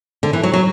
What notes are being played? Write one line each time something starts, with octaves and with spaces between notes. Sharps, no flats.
D3
E3
F#3
F#3